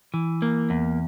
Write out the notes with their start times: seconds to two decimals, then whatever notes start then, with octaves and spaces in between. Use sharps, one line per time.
0.14 E3
0.42 A#3
0.70 E2